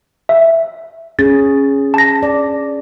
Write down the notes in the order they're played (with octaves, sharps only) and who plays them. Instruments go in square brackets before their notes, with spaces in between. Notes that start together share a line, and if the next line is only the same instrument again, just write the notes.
[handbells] E5
[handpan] C#4 G#4 [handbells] A6
[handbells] A5 A#6
[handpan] D5